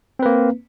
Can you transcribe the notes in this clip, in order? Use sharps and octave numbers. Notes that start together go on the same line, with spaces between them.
A#3 C4 B4